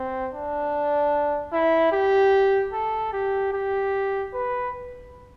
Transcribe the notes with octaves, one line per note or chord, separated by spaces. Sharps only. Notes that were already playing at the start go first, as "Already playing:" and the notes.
Already playing: C4
D4
E4
G4
A4
G4
G4
B4